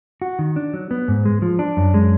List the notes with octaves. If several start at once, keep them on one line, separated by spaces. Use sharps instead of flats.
F#4
D#3
D4
F#3
B3
G#2
G#3
F3
D4
F#2
G#3